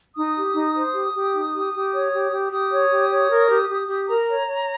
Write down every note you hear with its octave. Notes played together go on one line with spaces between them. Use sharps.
D#4 D#6
G4
D#4
C5
G4
G4
D#4
G4
G4
C#5
G4
G4
G4 D#6
C#5
G4
C#5
A#4
G4
G4
G4
A#4 A#5
C#5
C#5